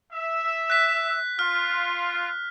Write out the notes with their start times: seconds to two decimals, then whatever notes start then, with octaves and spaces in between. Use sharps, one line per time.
0.11 E5
0.70 F#6 B6
1.39 F4 F6